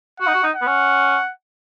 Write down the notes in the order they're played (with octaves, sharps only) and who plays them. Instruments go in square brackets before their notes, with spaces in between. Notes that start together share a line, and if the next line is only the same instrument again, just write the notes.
[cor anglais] F#4 [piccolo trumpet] F#5
[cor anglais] D#4
F#4
D#4
[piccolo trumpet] F#5
[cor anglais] B3
C#4